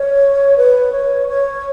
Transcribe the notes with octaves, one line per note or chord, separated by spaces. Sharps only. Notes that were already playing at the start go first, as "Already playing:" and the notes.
Already playing: C#5
B4
C#5
C#5